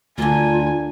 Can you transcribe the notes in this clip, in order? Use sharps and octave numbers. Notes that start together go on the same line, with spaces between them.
D2 D3 A#3 F4 G#5